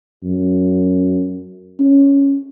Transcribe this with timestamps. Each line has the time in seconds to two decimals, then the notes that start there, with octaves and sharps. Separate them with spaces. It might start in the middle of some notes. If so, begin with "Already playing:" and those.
0.24 F#2
1.80 C#4